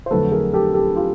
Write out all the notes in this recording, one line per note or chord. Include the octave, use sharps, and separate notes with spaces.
C5
F2 D3 F#3 A3 A4 B4
G#4 A#4
G4 A4
G4 A4
F4 G4